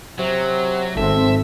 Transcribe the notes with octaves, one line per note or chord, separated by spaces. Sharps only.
C3 F#3
G#1 C4 A4 E5